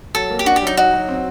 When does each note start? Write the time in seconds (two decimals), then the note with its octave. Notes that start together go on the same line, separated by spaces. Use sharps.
0.14 F#3 A4
0.30 A#3
0.39 G4
0.46 D4 F#4
0.56 G4
0.62 F#3 D#4
0.77 D#4 F#4
0.93 F#3
1.09 C4